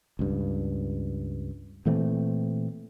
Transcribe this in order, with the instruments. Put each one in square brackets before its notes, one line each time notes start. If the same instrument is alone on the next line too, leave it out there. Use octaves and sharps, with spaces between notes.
[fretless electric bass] C#2 G2
A#2 E3 A3 C4